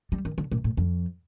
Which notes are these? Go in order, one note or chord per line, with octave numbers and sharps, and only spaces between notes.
G3
D#3
D3
A#2
A2
F2